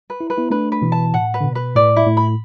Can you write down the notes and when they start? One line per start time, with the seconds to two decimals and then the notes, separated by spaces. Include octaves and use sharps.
0.10 B4
0.21 E4
0.30 B4
0.37 B3 E4
0.50 A3 D4 B4
0.72 B4
0.82 B2 E3
0.92 A5
1.14 A2 F#5
1.34 B4
1.41 D3
1.44 B2
1.55 B4
1.75 A2 D5
1.96 E4
2.07 A2
2.17 B5